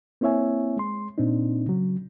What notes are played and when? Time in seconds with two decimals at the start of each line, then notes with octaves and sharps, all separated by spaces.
0.21 A#3 C4 E4 C#5 E5 G#5
0.77 G#3 C6
1.18 A#2 C4 D4 D#4
1.66 C#3 F#3